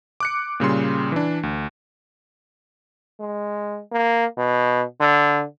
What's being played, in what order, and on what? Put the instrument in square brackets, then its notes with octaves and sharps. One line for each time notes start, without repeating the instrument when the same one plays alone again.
[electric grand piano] D6 F#6 C#7
A#2 C#3 G3 C6
E3 D4
D2
[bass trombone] G#3
A#3
B2
D3